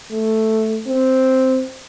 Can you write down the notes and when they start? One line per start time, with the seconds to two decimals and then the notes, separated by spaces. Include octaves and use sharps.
0.12 A3
0.88 C4